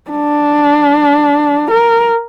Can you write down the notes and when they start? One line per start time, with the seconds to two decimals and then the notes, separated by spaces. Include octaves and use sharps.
0.11 D4
1.71 A#4